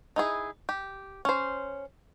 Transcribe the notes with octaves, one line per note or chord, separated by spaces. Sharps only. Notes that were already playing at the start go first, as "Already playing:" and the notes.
D#4 E4 G#4
G4
C#4 C5